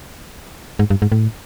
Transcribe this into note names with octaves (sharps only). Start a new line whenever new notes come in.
G#2
G2
G#2
A2